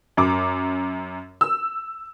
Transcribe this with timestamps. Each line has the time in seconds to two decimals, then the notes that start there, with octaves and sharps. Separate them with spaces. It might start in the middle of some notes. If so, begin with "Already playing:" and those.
0.17 F#2 D6
1.41 E6